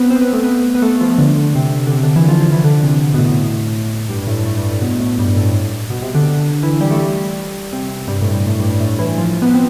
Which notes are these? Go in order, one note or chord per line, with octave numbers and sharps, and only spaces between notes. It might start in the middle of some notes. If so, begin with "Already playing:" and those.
Already playing: B3 C4
C4
B3
A3
B3
B3
A3
F3
D3
C3
D3
C3
D3
E3
F3
F3
E3
D3
C3
B2
A2
G2
A2
A2
G2
A2
B2
A2
G2
A2
B2
C3
D3
D3
E3
G3
A3
G3
C3
G2
A2
G2
A2
G2
A2
E3
F3
B3
C4